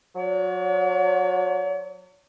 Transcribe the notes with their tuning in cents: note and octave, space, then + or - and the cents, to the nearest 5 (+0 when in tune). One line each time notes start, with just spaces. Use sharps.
F#3 -30 C#5 +45